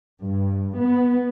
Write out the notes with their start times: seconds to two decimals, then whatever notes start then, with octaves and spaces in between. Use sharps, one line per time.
0.22 G2
0.78 B3